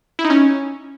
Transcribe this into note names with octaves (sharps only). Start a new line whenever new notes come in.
E4
D#4
C#4